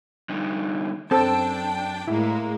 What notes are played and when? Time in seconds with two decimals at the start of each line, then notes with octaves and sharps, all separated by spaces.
0.29 D3 G3 D#4
1.11 F#2 C4 D4 A4 G5 A5
2.08 A2 G#3 A#3 E4